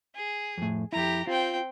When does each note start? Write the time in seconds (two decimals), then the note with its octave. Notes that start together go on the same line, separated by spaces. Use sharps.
0.15 G#4
0.58 F2 A2
0.93 F2 E4 G4 A#5
1.27 C4 F4 G5